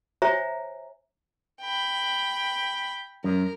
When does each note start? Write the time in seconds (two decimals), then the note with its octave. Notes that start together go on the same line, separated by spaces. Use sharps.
0.22 C5 C#5 E5 G#5 A#5
1.61 G5 B5
3.24 F#2 A#4